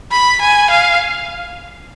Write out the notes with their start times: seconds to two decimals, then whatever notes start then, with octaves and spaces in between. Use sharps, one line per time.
0.12 B5
0.41 G#5
0.70 F5